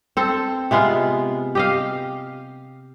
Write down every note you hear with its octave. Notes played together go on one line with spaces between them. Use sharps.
C4 A4
C3 G#3 B3 F4
G4 D#5 F5